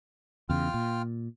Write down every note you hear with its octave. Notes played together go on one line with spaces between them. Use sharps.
E2 C#3 F4 G5 F6
A#2